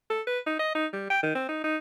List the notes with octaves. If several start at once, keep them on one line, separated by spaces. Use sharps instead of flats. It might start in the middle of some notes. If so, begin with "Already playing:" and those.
A4
B4
D#4
D#5
D#4
G3
G5
D#3
C4
D#4
D#4